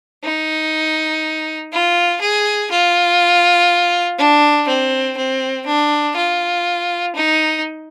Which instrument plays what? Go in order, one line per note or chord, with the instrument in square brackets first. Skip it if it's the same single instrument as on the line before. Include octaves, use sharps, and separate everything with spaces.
[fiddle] D#4
F4
G#4
F4
D4
C4
C4
D4
F4
D#4